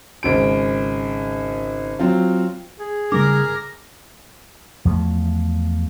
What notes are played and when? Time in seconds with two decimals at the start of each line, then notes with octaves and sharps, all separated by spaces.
0.23 G#1 C#3 D7
1.99 F#3 C4 F4
2.80 G#4
3.12 C#3 G3 D4 A#4 D6
4.85 E2 F3 F#3 A3